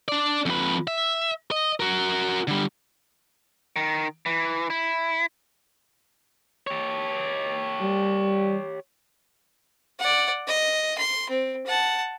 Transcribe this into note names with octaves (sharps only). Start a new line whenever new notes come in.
D4 D5
F2 B4
E5
D#5
F#4 A#4
D3 G3
D#3
E3
E4
G4 C#5
G3
D5 F#5
D#5
C6
C4
F#5 A5